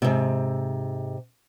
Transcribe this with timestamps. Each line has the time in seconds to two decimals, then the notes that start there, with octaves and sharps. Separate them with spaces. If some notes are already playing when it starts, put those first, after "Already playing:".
0.02 G#2 C3